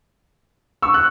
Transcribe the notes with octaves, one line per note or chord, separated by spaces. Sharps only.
C#6 E6
F#6